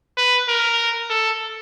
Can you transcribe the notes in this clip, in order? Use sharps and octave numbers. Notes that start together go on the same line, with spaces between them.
B4
A#4
A4